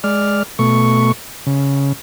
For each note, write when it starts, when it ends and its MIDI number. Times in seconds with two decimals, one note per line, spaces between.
0.04 0.43 56
0.04 0.43 74
0.04 0.43 89
0.59 1.12 47
0.59 1.12 57
0.59 1.12 85
1.47 1.93 49